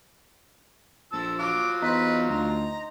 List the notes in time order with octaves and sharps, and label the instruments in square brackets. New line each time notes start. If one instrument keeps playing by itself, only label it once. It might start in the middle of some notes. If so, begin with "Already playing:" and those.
[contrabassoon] A#1 [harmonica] F3 A5 E6
[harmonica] F#3 F4 [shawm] D6
[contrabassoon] E2 [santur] D#4 C5 [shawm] B4
[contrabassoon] D2 [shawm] A#5